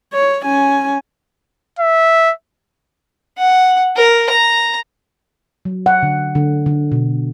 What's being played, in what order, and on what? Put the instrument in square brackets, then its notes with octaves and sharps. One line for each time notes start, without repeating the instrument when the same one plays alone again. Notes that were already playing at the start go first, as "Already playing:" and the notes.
[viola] C#5
C#4 G#5
[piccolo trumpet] E5
[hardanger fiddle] F#5
A#4
A#5
[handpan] F#3
F#5
D3
D3
D3
B2